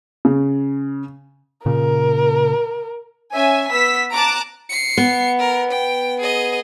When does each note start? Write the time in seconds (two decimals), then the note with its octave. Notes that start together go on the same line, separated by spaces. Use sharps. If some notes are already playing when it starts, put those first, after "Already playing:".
0.25 C#3
1.66 A#2 C#3 A#4
3.32 C#4 E5 G#5
3.70 B3 E6 B6
4.11 A5 A#5 D6 F#6 D7
4.69 C7 C#7
4.97 B3
5.39 A#4
5.71 G5
6.20 G#4 D#5